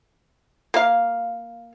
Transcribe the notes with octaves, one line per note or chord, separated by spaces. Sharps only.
A#3 F5